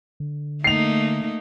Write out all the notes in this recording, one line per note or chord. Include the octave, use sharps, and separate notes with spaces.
D3
A3 A#3 D#4 C7 F7